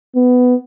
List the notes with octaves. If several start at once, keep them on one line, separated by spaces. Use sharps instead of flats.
B3